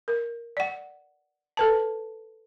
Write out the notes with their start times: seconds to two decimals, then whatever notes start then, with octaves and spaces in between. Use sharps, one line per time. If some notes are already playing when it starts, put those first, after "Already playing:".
0.08 A#4
0.57 D5 F#5
1.57 A4 B4 A5